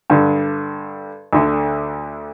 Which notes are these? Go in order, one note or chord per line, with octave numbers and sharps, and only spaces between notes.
G2 D3
D2 D3